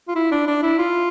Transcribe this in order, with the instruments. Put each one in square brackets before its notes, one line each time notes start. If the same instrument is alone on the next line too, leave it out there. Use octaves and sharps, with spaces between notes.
[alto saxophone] F4
E4
D4
D4
E4
F4